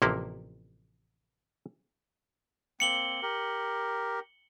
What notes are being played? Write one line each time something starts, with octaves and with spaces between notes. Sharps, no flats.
A1 C3 F3 A#3 E4
A#3 C4 C#7 F#7 G7
G4 A#4